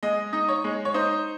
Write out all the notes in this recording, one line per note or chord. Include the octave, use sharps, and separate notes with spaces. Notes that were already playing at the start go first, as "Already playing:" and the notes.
G#3 D#5
D#4
C#5
G#3
C#5
D#4 C5